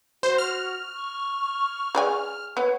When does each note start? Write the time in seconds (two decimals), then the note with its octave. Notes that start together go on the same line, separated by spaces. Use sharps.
0.23 F#4 C5
0.38 F6
0.95 C#6
1.95 G#4 D5 G#5
2.57 B3 C#5